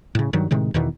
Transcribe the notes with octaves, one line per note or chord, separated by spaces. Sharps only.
A2 C#3
G2 D#3 F#3
A2 C3 D#3 G#3
E2 B2 D#3 E3